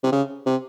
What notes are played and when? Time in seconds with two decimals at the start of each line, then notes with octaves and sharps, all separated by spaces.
0.04 C3
0.12 C#3
0.46 C3